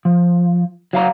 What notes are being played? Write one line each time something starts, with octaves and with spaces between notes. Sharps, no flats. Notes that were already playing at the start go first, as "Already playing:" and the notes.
F3
F#3 F5 A#5